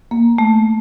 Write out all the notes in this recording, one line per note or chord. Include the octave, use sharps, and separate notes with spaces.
A#3
A3